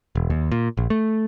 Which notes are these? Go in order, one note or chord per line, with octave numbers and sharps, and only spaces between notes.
E1
D#2
A#2
A#1
A3